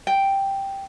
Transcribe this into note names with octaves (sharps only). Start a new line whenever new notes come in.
G5